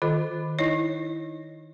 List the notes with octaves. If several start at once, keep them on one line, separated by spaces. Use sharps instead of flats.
D#3 F4 A4 D#5
D#4 E4 C#5 D#5